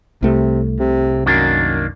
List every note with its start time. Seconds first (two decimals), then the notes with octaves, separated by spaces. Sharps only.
0.23 C2 C3 A3
0.79 C3
1.26 F#2 D#3 A#3 D4